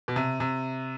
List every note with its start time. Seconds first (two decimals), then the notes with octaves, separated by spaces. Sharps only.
0.08 B2
0.16 C3
0.40 C3